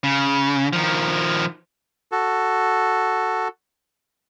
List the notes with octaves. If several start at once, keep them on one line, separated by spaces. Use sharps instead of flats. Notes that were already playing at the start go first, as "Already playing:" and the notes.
C#3
D#3 F3
F#4 A4